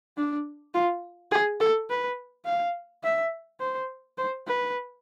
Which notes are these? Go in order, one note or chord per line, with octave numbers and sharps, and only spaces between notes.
D4
F4
G#4
A4
B4
F5
E5
C5
C5
B4